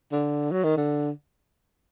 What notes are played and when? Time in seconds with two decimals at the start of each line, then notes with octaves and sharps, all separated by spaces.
0.12 D3
0.52 F#3
0.64 D#3
0.77 D3